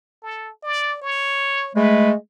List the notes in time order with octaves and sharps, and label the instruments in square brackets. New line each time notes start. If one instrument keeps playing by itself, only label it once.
[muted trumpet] A4
D5
C#5
[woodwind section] G#3 A3 [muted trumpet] B4